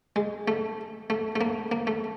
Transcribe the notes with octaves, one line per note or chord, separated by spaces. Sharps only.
G#3
A3
A3
A3
A#3
A#3
A3